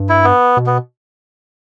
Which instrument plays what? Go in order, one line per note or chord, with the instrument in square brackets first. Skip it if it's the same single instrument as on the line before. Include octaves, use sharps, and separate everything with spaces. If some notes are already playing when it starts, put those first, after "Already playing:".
Already playing: [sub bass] G2
[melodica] E4
B3
[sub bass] B2
[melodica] B3